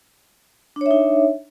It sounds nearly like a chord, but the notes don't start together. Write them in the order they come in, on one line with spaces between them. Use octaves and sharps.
D4 C#5 E5 D#4